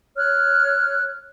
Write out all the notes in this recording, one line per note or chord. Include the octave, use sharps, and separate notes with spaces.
C#5 F6 F#6